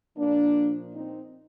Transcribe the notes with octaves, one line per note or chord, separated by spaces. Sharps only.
A#2 F3 A#3 D4
C4 D#4